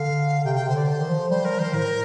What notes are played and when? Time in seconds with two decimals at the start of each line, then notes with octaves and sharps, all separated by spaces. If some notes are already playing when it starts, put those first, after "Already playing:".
Already playing: D3 F5
0.45 C3 G5
0.55 C3 G5
0.66 D3 C5
0.77 D5
0.87 C5
1.00 D#3
1.09 F3
1.30 G3 C5
1.45 F3 A#4
1.59 D#3 C5
1.74 A2 A#4